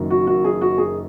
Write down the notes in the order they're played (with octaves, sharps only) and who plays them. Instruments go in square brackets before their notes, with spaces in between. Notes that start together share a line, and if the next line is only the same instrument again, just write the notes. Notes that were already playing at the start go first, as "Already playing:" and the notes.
Already playing: [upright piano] F#1 F#2 D#3
F#4
F#4
G#4
F#4
G#4